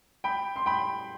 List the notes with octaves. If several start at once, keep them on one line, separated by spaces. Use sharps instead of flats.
G5 B5
C6
G5 B5